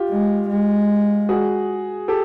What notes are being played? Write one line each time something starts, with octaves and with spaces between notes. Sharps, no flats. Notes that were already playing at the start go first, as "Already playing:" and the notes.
Already playing: F4 G4
G#3
G#3
F#4 G#4
G4 A4